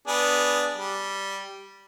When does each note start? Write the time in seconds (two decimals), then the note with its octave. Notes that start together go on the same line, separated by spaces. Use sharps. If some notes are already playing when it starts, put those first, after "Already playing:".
0.07 B3 D4 G#4
0.76 G3